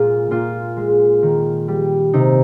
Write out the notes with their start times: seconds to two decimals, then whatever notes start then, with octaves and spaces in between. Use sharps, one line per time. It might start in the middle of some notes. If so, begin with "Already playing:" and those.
Already playing: A#2 G#3 F4
0.31 A#2 F4
0.77 G#3
1.23 D#3
1.68 G3
2.13 C3 D#4